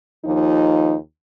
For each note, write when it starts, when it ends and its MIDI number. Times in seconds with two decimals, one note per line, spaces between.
0.25 0.96 39
0.25 0.96 53
0.25 0.96 63
0.25 0.96 65